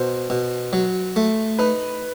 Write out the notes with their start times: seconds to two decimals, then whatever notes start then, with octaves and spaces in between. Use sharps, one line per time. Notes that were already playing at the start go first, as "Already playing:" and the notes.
Already playing: B2 C5
0.30 B2
0.73 F#3
1.16 A3
1.59 D#4 B4